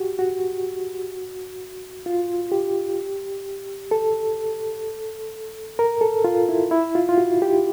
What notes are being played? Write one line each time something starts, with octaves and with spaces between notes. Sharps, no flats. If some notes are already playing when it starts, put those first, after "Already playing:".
Already playing: F#4 G4
F#4
F4
G4
A4
A#4
A4
F4
E4
E4
F4
F4
F#4
G4